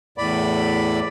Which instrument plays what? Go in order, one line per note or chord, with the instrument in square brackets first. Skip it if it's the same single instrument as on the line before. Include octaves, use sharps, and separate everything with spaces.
[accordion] E2 A2 D5 B5